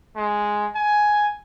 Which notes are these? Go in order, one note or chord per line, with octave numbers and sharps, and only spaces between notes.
G#3
G#5